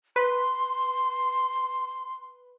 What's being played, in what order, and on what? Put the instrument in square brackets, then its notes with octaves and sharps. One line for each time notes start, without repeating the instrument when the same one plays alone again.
[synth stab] B4 [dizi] C6